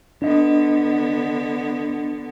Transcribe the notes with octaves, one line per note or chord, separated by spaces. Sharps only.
D3 B3 D4 D#5